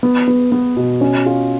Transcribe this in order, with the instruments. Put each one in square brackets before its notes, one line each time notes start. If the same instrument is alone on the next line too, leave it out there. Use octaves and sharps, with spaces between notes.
[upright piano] B3
B3
B3
B2
C#4
F4